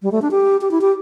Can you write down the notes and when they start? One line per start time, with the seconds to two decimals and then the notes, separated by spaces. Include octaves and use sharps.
0.02 G3
0.12 A3
0.22 D4
0.31 G4
0.61 G4
0.71 E4
0.81 G4